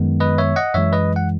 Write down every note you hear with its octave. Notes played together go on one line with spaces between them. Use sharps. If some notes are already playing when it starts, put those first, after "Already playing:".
Already playing: F#2 D#3 G#3 B3
B4 D#5
C#5 E5
D#5 F#5
F#2 E3 G#3 C#5 E5
B4 D#5
F#5